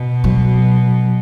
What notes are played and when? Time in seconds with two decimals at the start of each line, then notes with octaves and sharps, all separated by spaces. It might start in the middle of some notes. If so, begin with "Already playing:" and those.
Already playing: B2
0.24 F#3